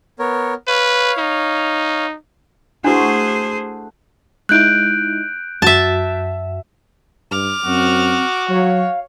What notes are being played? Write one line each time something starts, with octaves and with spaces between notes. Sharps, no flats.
B3 A#4 C#5
B4 C#5 F5
D#4
A3 D4 E4 F#4 G#4 C5 F#5
G#3 D#4 E4 F#6 G6 D7
F#2 F#4 E5 A5
G2 D6 F6
F#2 C4 F#4
F#3 C#5 F5